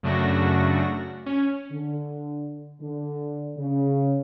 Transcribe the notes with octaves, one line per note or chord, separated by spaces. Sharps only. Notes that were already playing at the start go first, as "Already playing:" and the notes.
F#2 C#3 A3 D4 F#4 A#6
C#4
D3
D3
C#3